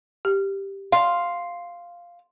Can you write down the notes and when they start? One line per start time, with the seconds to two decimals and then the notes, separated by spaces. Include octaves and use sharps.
0.25 G4
0.92 F5 C6